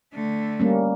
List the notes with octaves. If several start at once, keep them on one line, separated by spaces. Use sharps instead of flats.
D3 A3
G3 A#3 C#4